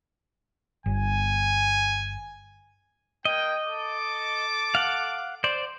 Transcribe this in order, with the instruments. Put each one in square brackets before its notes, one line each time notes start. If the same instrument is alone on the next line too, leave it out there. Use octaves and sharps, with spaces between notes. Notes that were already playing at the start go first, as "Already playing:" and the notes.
[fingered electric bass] G1 [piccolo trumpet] G#5
[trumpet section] A#3 G5 [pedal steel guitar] D#5
[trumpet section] A4 D6
[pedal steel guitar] F5 F#5
C5 D5